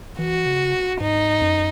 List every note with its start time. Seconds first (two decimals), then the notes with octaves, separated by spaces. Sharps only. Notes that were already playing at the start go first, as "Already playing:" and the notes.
0.19 E3 F#4
0.46 C#3
1.01 G#2 D#4
1.42 F#2